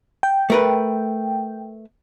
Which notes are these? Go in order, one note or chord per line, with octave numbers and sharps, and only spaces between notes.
G5
A3 A#4 B4